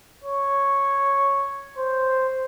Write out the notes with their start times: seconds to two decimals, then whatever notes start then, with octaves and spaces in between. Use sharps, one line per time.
0.24 C#5
1.77 C5